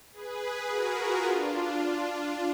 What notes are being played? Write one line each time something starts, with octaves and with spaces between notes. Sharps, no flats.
G#4 B4
F#4 A#4
F4 G#4
D4 F4